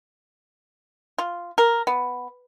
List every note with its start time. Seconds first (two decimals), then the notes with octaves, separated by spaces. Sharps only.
1.18 F4
1.58 A#4
1.87 B3